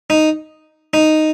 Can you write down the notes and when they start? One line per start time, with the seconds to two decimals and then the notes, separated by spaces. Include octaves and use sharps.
0.10 D#4
0.94 D#4